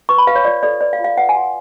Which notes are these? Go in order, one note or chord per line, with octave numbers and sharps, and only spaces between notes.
B4 C#6
B5
B4 F5
C#5
F4 D5
A4 D5
B4 D5
F5
F4
F5
B4 F#5
G#5
F#4